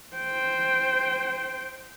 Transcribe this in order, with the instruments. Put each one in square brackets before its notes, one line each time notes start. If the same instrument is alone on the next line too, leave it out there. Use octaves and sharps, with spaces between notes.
[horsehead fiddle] C5 G5